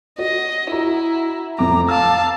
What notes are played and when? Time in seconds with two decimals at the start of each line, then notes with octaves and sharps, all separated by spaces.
0.18 F#4 D#5
0.72 E4 F#4 A#5
1.59 F1 F2 A#5 D6
1.89 F5 A5 D6 E6